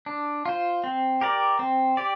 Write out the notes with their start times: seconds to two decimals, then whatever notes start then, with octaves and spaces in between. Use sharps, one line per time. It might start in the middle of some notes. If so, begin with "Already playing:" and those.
0.06 D4
0.46 F4 C5
0.84 C4
1.21 G4 A#4 D5
1.59 C4
1.97 G4 D5